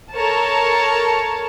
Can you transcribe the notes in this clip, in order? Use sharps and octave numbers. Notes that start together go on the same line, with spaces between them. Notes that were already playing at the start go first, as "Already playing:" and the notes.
A4 A#4 C#5 A5